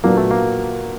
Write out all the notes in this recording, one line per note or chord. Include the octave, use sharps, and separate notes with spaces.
A#2 F#3 A#3 B3 D4
A3
A#3